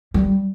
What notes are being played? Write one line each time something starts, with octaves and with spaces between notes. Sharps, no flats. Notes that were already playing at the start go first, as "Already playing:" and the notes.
G3